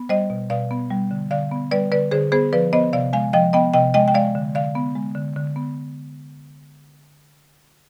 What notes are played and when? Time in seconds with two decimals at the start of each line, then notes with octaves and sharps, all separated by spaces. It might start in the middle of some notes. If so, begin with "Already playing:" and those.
Already playing: B3
0.09 G3 C5 D#5
0.30 B2
0.50 B2 D5 F5
0.71 B3
0.91 G3
1.11 D3
1.31 D3 D5 F5
1.52 B3
1.71 G3 B4 D5
1.92 D3 B4 D5
2.11 D3 G#4 C5
2.32 B3 G#4 C5
2.53 F3 B4 D5
2.73 B3 C5 D#5
2.93 C3 D5 F5
3.13 G#3 F5 G#5
3.33 F3 D#5 G5
3.53 B3 D#5 G5
3.74 C3 D#5 G5
3.94 G#3 D#5 G5
4.08 G5
4.14 G#3 D5 F5
4.35 D3
4.55 D3 D5 F5
4.75 B3
4.95 G#3
5.15 D3
5.36 D3
5.56 B3